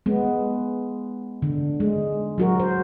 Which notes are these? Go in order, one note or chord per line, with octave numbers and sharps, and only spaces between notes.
G#3 B3
D3
G#3
F#3 F#4 A#4
C5